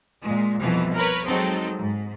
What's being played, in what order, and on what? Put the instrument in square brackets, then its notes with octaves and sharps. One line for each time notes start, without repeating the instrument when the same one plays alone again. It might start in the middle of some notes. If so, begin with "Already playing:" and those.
[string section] A#2 G#3
C2 F2 B2 E3 F3
A#4 B4 C#5
F#3 G#3 C4 D#4 A4
G#2